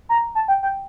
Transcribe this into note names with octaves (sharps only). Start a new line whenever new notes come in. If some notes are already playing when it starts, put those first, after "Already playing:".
A#5
A5
G5
G5